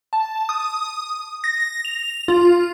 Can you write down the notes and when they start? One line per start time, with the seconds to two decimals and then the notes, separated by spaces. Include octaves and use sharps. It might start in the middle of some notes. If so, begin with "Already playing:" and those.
0.13 A5
0.49 D#6
1.44 A#6
1.85 F7
2.28 F4